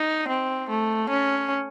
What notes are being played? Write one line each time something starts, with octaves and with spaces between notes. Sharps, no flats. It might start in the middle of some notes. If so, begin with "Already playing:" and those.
Already playing: D#4
C4
A3
C#4